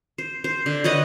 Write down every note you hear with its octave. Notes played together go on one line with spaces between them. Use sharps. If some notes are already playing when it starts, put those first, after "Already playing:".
C5
C5
D3
B4 C#5 D#5 F#5